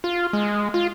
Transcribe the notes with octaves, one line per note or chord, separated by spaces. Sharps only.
F4
G#3
F4